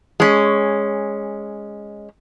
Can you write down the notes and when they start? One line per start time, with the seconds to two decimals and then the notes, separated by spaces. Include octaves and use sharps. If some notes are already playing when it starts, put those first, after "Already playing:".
0.20 G#3 C#4